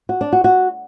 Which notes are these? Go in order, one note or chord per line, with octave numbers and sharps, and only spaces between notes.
F#4
D4
F#4
F#4